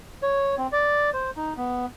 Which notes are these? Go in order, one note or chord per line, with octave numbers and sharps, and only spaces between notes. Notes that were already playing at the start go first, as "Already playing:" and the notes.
C#5
C4
D5
C5
D#4
B3